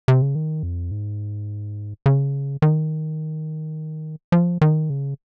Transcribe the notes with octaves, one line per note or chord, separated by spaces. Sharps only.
C3
C#3
D#3
F2
G#2
C#3
D#3
F3
D#3
C#3